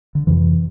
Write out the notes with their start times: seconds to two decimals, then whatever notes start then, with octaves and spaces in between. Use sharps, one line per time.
0.15 D3
0.27 F2 C3 E3